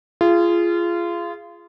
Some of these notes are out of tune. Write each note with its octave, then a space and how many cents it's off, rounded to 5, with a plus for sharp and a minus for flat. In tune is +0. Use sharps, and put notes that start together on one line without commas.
F4 -25 G#4 +0